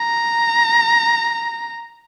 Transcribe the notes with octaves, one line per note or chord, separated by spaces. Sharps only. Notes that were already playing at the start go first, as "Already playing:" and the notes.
Already playing: A#5